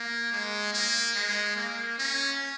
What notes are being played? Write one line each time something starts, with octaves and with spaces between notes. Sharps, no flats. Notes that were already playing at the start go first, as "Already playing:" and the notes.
Already playing: A#3
G#3
A#3
G#3
A#3
C#4